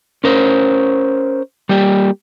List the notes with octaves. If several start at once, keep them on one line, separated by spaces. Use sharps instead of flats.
C#4 A#4 C5
G3 A#3 G4